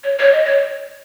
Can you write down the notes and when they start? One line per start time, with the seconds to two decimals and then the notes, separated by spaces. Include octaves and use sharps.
0.04 C#5
0.19 C#5
0.32 D#5
0.45 C#5